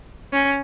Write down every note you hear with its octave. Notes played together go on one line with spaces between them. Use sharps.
C#4